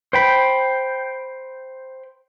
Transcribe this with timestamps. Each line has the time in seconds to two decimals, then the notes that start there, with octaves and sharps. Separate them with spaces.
0.13 C5 G5 B5